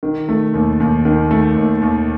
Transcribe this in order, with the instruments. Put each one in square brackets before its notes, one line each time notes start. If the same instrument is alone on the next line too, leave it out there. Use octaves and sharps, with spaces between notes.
[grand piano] D#3
A3
D#2
D#2
D#3
A3
D#2
D#2